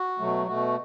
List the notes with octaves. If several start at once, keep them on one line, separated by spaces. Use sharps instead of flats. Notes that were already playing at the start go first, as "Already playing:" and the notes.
Already playing: F#4
B2 F#3 A3
B2 A3 F#4